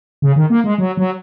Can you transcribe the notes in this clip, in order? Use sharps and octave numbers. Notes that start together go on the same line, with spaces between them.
C#3
D#3
A#3
G#3
F#3
F#3